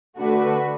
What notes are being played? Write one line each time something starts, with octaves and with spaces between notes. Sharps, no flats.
D3 A3 D4 F#4 B4